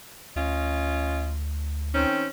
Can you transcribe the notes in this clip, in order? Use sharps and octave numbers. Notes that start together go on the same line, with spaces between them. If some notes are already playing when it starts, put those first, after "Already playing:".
D2 C#4 F4 D#5
D#3 C4 C#4